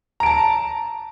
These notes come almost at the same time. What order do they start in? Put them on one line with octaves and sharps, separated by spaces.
A#5 D7 A5